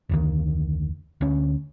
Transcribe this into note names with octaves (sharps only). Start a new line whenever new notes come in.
F1 D2 D#3
D2 C#4